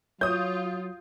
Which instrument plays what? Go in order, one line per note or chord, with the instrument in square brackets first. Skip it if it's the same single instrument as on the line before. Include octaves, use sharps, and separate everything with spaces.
[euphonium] F#3 [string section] F4 [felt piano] C#5 [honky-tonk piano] D#6 G6